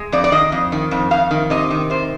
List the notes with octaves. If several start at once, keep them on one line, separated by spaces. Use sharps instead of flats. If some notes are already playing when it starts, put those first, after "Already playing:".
Already playing: G#3
F2 D5
D5
D#3 D#5
F2
D#3
F2
F2 F5
D#3
C3 D#5
D#3
C3 C5